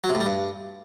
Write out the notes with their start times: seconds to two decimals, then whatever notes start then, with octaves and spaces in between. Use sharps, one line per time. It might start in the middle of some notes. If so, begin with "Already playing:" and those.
0.04 F#3
0.09 C3
0.15 A2
0.21 G3
0.26 G2